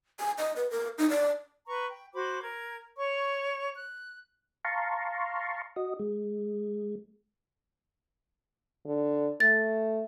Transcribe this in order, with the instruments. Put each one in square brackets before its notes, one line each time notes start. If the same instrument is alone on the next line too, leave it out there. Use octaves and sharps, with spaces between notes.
[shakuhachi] G#5
D#5
B4
A#4
D#4
D5
[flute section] B4 A#5 C#6
G5
F#4 C5 B5 D6
A#4 G#6
C#5 C#6
F#6
[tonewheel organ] F5 A5 A#5 C6 C#6
F#4 D#5
G#3
[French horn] D3
[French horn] A3 [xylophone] A6